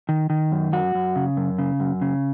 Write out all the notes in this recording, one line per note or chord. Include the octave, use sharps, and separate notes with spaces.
D#3
D#3
F#2
F#2 F#4
F#2
C#3
F#2
C#3
F#2
C#3